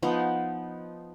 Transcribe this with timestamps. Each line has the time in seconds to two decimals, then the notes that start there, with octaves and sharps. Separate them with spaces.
0.03 F3 B3 D#4